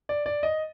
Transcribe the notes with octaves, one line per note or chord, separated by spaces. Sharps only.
D5
D5
D#5